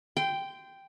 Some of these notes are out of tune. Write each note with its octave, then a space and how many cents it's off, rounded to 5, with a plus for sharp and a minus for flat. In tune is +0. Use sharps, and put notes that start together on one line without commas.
G5 +0 C6 -25